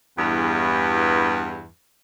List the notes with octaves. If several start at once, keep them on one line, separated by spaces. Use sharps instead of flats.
E2 G2